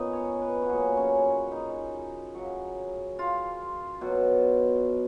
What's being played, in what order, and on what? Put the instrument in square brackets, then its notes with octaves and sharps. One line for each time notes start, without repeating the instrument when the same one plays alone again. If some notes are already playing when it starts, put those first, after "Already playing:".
Already playing: [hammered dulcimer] A#2 B3 C#4 D#4 D#5
C#5
B4
F#4
A#2 F#3 G#4
C#4
C#4
D#4
C#3 F#3
F4
B2 F#3